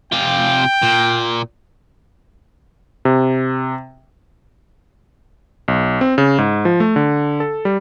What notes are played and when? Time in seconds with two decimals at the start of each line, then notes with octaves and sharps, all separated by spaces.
0.12 C3 F4 G5
0.83 A#2
3.05 C3
5.68 B1
6.01 C4
6.18 C#3
6.38 G#2
6.65 F3
6.80 A3
6.96 D3
7.40 A4
7.65 G3